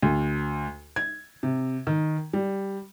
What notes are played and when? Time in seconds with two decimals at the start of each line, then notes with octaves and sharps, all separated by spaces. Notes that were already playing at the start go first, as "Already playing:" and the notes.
0.02 D2
0.96 G#6
1.43 C3
1.87 D#3
2.33 G3